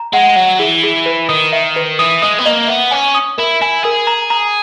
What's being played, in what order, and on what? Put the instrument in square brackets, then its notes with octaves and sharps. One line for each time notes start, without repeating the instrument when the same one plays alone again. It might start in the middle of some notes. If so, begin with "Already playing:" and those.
Already playing: [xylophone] A#5
[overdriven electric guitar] G#3 [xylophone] F#5
[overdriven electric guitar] F#3 [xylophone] F#5
[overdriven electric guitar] E3 [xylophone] G#4
[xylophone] G#4
B4
[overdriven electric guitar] D#3 [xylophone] D#6
[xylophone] E5
B4
[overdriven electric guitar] E3 [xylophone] D#6
[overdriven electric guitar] G#3 [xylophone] D#6
[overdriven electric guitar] B3
[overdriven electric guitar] A#3 [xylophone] D#5
[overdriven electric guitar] B3 [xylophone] E5
[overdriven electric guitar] C#4 [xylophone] G#5
[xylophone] D#6
[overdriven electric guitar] E4 [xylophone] A#4
[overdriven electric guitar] E4 [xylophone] G#5
[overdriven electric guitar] G#4 [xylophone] A#4
[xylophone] A#5
A#5